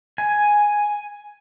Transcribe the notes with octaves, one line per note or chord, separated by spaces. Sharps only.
G#5